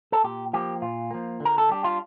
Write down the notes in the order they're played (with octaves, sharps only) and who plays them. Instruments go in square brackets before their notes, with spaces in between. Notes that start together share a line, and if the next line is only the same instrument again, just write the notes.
[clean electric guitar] A4
A#2 G4
F3 A#3 G4
A#2 F4
F3 A#3
D3
A#4
A4
G3 D4 G4
F4